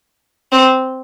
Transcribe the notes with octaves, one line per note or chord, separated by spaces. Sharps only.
C4